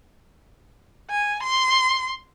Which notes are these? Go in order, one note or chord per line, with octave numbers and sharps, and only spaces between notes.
G#5
C6